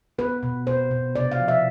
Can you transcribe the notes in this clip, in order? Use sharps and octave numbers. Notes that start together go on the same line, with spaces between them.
B3 B4
B2
B2 C5
B2
C3 D5
F5
F3
E5